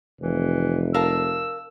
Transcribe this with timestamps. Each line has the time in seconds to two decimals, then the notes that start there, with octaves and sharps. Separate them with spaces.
0.21 F1 E3
0.94 A#4 F5 A5 E6